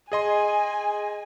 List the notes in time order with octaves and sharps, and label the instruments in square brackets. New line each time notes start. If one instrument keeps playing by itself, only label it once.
[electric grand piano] G#4 D#5 C6 [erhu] G#5